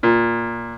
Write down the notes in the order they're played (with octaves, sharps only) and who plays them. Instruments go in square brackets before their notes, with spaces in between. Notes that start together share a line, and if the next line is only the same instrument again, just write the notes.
[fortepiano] A#2